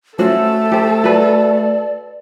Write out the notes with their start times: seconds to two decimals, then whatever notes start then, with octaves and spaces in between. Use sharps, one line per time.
0.19 A3 C#4 F#4 A4 C5
0.72 G4 C5
1.04 F#4 B4 D5